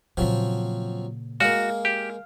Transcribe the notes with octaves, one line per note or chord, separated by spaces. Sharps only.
A#2 C#3 F3 F#3 C4
G#3 A#3 F#4 F5
G4